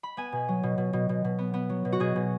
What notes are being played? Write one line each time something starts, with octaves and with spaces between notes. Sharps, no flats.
B5
B3 G#5
B2
F#3
B2
B2
B2
B2
B2
B3
B3
F#3
B2
F#4
B2 G#4
B2